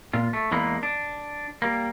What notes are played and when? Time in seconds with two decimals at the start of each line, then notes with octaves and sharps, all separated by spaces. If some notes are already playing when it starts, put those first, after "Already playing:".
0.13 A#2 F4
0.33 A3
0.51 E2 E3 G#3 A#3 B3
0.83 D4
1.62 G3 A#3